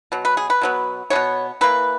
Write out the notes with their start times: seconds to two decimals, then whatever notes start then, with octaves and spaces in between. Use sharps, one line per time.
0.12 B2 F#3
0.25 B4
0.37 G#4
0.50 B4
0.61 B2 F#3 B3
1.10 B2 G#3 B3 C#5
1.61 E3 A#3 B4